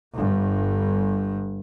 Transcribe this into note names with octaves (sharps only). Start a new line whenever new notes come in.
G1 G2